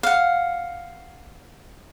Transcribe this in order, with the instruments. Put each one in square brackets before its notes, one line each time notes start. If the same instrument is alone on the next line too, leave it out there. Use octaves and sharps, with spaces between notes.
[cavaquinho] F5 F#5